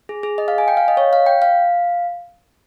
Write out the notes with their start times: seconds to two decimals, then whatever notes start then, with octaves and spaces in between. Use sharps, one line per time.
0.09 G#4
0.23 G#4
0.38 D#5
0.48 F5
0.58 G#5
0.68 G5
0.77 F5
0.88 D#5
0.97 C#5
1.13 F5
1.26 G5
1.42 F5